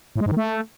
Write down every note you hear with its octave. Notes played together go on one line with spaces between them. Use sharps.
A2
G#3
G#2
D#3
A3